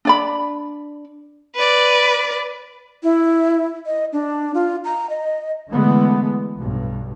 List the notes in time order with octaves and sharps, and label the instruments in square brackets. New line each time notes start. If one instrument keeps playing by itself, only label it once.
[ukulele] D4 D5 B5
[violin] B4 D5
[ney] E4
D#5
D4
F4
A#5
D#5
[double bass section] D3 E3 G#3 A3 B3
B1 G2